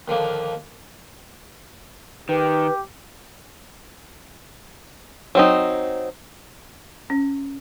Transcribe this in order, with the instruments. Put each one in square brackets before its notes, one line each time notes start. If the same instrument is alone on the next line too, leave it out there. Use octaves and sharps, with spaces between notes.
[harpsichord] D#2 D3 F3 A#3
[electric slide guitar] D#3 [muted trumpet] G4 [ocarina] B4
[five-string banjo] F#3 C4 D#4
[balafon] C#4